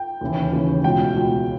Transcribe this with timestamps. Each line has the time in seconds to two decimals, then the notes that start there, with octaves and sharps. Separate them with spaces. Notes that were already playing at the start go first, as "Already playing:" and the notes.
Already playing: G5
0.21 D#2 C#3 E3
0.52 D#2 C#3 E3
0.84 C#2 B2 G5
1.16 C#2 B2